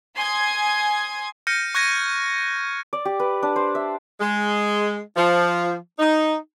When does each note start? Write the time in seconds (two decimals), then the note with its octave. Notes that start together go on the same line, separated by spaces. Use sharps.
0.15 G#5 C6 D#6 G#6
1.47 F6 G6 A#6 C#7 D#7
1.75 C#6 F#6 G#6 A#6 D#7
2.93 D5
3.05 G4
3.20 B4
3.42 D4
3.56 C5
3.75 E5
4.20 G#3
5.16 F3
5.99 D#4